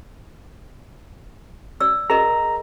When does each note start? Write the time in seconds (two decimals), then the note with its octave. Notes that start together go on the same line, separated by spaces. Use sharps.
1.80 D5 E6
2.10 G#4 A#4 D#5 A#5